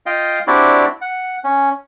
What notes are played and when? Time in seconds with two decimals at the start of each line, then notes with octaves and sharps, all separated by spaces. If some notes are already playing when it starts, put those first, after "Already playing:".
0.06 F4 D#5 F5 G5
0.47 C4 D4 E4 F#4 G4 D5
1.01 F#5
1.44 C#4